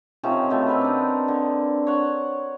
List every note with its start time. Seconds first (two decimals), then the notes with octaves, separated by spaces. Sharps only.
0.23 C3 D#3 F3 C#4
0.50 B2 A3
0.67 C4 A#4 B4
0.81 D4 D#4
1.28 D3
1.87 C#5 F#5